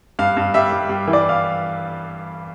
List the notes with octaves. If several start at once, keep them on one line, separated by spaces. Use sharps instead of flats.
G2 F5
G2
G3 E5
G2
G3
E3
D5
F5